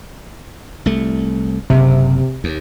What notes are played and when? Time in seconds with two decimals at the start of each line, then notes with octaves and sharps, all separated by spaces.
0.86 C2 A3
1.70 F#1 C3
2.44 D#2